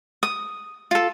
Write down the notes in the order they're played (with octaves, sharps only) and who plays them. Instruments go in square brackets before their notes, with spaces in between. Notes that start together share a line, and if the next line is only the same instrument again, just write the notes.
[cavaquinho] D#6
F4 A4